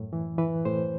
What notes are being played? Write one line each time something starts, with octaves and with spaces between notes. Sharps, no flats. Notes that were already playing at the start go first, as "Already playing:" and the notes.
Already playing: F#2 A2
E3
E3 B4
A2 C5